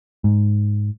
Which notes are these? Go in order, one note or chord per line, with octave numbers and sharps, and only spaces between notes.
G#2